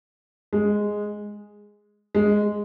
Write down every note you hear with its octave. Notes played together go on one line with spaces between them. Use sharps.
G#3
G#3